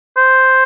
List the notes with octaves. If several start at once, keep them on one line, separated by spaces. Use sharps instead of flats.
C5